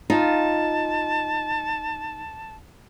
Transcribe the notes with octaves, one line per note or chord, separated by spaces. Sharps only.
D#4 F4 A5